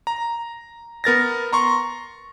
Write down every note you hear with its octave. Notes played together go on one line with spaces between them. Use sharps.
A#5
B3 A#4 A6 A#6
A#5 C6 C#6